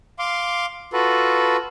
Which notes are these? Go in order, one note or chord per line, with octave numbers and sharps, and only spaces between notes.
F5 C6 D6
F4 F#4 A4 B4